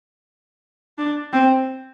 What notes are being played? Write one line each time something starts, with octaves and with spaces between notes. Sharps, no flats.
D4
C4